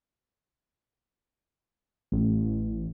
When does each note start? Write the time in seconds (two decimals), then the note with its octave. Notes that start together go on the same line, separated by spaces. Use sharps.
2.12 A1